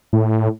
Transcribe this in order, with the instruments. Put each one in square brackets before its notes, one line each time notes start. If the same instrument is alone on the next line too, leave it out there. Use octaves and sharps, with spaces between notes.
[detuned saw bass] A2